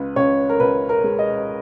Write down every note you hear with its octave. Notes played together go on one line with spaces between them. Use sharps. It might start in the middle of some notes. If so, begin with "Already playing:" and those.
Already playing: C#2 B4
C#2 C#5
A#4
C#2 B4
A#4
G#3
D#5